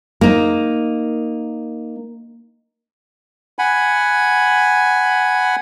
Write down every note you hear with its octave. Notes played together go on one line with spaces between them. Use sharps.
A#3 D#4
F#5 G#5 B5